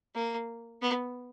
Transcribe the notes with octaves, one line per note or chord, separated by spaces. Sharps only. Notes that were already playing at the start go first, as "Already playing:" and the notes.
A#3
B3